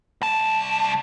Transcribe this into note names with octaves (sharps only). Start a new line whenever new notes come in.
C2 A5